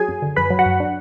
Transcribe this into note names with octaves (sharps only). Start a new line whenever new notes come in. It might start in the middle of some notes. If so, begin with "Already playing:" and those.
Already playing: F#3 G#4 G#5
F#2
D3
F#2 B4 B5
F#3
F#4 F#5
F#2
D4